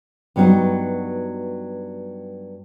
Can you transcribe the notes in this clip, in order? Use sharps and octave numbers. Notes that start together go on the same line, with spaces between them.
G2 F#3 B3 D#4 E4 F#4